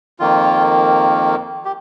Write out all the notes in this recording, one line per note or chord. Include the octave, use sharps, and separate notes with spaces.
F2 D#3 A#3 F4
G4